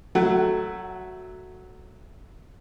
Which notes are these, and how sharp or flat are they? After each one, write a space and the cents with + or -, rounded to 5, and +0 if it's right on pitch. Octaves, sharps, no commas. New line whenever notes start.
F#3 +0 A3 +0 F#5 +40